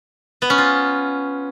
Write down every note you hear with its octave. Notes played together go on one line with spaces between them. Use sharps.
B3
C#4
F4